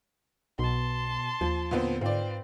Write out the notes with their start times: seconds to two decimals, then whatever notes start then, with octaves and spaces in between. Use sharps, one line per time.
0.59 B1 B2 A5 C6
1.41 D#2 F3
1.71 A#2 D3 B3 C4
2.01 G#2 C4 F4 B4 D5